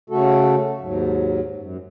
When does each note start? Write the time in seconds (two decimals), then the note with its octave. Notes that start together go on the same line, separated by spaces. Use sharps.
0.10 C#3 A3 F#4 A4
0.81 D#2 G#2 F#3
1.56 F#2